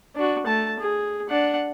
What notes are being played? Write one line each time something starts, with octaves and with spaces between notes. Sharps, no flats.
D4 F#4
A3 A5
G#4
D4 F#5